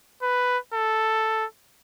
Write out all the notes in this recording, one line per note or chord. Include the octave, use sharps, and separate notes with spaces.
B4
A4